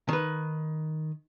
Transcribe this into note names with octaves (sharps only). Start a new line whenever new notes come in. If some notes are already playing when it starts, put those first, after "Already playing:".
D#3 B4